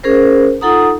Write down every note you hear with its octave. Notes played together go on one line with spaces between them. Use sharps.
C#4 G#4 A#4 C5
D#4 F4 A4 F#5 A#5 D#6